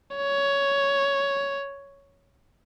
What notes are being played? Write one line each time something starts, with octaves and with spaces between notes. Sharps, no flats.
C#5